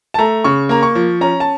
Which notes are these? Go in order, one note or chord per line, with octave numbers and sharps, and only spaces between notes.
A5
A3 A#5
C#3 C#6
A#3 A#5
C#6
F3
C#4 A#5
A5